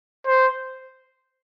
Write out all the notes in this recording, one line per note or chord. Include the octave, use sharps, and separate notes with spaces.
C5